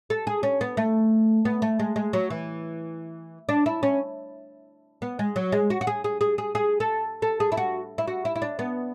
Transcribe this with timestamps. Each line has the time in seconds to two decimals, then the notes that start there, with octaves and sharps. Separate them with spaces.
0.10 A4
0.27 G#4
0.43 C#4
0.61 B3
0.77 A3
1.45 B3
1.62 A3
1.79 G#3
1.96 G#3
2.13 F#3
2.30 E3
3.49 D4
3.66 E4
3.83 C#4
5.02 B3
5.19 G#3
5.36 F#3
5.52 G#3
5.70 F#4
5.81 F#4
5.87 G#4
6.04 G#4
6.21 G#4
6.38 G#4
6.55 G#4
6.80 A4
7.22 A4
7.40 G#4
7.52 E4
7.57 F#4
7.98 E4
8.07 F#4
8.25 E4
8.36 E4
8.42 D4
8.59 B3